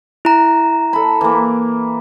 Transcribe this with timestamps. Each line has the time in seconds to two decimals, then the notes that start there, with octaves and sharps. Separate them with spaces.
0.25 E4 A#5
0.93 A4 B5
1.21 E3 A#3